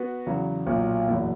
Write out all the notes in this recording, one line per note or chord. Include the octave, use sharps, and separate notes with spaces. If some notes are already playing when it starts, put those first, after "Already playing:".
Already playing: B3 F#4
E2 C#3 F#3
B1 A#2 F#3
F#1 E2 B2 F#3